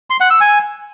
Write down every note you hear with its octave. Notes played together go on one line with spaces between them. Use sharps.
C6
F#5
E6
G#5